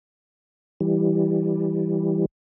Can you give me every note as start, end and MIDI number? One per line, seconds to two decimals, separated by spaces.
0.80 2.25 52
0.80 2.25 55